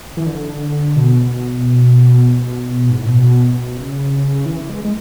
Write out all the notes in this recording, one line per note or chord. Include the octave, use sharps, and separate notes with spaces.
E3
D3
B2
G#2
A2
B2
C#3
E3
G#3
G#3